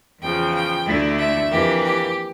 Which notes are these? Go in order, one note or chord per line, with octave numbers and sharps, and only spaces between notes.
E2 C#3 F3 G5
G5
D2 D3 A3 E4
E5
F2 E3 A#3 G4
G4